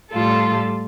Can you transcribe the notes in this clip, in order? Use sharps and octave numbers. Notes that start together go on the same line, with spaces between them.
A2 G3 F4 A4